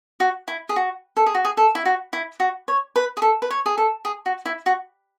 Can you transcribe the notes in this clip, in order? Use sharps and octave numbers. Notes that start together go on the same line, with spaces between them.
F#4
E4
G#4
F#4
A4
G#4
F#4
G#4
A4
E4
F#4
E4
F#4
C#5
B4
G#4
A4
B4
C#5
G#4
A4
G#4
F#4
E4
F#4